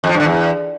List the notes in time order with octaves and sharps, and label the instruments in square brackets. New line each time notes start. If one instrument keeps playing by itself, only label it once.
[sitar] F2
F3
G2
D3
E2